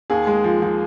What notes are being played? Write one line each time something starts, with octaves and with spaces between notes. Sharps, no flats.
D#2 G#4
G#3
F3
F3